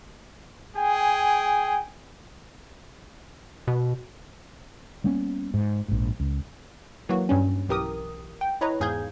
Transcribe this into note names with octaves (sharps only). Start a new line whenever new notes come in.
G#4 G5 G#5
B2
G3 A#3 B3 C#4
G#2
A#1 G#2
C#2
E3 F#3 A#3 F#4
G2 G3 C#4
B1 E3 G4 A#4 D#6
G5
E4 B4 C#5 D#5 A#5
E2 G#2 G#4 F5 G6 G#6